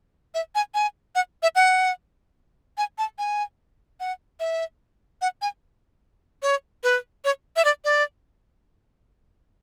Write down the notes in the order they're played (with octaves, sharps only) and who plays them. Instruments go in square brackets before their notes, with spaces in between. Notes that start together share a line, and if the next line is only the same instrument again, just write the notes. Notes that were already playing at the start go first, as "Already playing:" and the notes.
[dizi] E5
G#5
G#5
F#5
E5
F#5
G#5
A5
G#5
F#5
E5
F#5
G#5
C#5
B4
C#5
E5
D5
D5